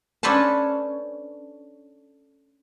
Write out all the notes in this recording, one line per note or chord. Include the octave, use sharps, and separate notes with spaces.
C#4 D4 A4 B4 C5 A5